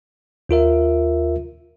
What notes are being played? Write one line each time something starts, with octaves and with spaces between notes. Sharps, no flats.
D#2 F4 A#4 E5